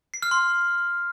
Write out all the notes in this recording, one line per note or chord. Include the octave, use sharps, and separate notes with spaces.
C7
F6
C6